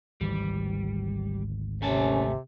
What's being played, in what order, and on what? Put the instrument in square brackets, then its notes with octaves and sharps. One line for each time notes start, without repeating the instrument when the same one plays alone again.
[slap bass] G#1 D2 E3 [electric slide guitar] G3
[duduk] C3 [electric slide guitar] A3 G#5 A5 [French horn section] A#3 C#4